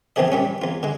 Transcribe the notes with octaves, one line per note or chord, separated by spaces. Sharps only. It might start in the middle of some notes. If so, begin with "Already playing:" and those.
A#1 E2 G#2 D#3 G#4 D#5
A#2 G3 C#4
E2 F4
D3 G#3